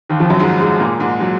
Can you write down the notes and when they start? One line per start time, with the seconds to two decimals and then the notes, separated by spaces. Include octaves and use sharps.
0.09 D#2 D#3
0.20 F2 F3
0.30 F#2 F#3
0.39 G#2 G#3
0.60 G#2 G#3
0.80 A#2 A#3
1.00 G#2 G#3
1.21 F#3